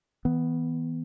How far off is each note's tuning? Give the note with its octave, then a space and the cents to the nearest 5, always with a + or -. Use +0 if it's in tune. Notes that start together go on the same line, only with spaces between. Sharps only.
E3 -35 B3 +0